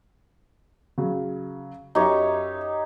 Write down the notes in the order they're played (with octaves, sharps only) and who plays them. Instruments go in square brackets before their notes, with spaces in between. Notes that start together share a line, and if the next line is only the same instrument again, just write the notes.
[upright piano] C#3 F#3
[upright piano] F#2 E5 [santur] D#4 G4 C#5